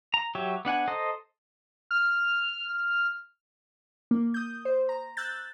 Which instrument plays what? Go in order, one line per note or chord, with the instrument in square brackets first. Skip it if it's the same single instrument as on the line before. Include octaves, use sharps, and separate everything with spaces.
[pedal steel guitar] A#5
F#3 G4 C#5 E5
B3 D4 F#5 G#5
A4 C5 D#5 A#5
[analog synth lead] F6
[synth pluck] A#3
D#6 G6
C5
A#5
E6 F#6 G6 A6